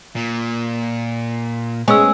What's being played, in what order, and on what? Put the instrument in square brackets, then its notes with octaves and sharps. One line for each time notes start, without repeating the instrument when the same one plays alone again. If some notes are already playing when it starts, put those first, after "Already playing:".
[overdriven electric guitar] A#2
[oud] G#3 B3 C#4 [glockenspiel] G#5 E6